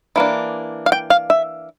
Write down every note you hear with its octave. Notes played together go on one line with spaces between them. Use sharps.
E3 A#3 D4
F5
G5
F5
E5